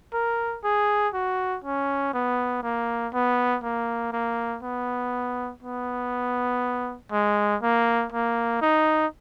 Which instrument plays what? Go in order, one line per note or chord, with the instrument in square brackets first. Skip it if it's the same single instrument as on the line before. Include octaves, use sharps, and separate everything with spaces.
[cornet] A#4
G#4
F#4
C#4
B3
A#3
B3
A#3
A#3
B3
B3
G#3
A#3
A#3
D#4